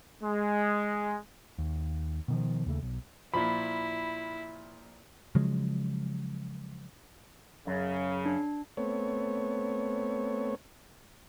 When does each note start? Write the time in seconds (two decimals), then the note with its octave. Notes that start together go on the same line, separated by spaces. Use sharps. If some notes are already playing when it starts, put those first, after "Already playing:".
0.23 G#3
1.58 D#2
2.28 B2 D#3 F3
2.66 D#2 C#3 A3
2.82 B1
3.34 A#2 F3 E4 B5
5.35 C#3 F3 F#3 G#3
7.67 F#2 C#3
8.26 D4
8.77 A3 B3 C4 C#5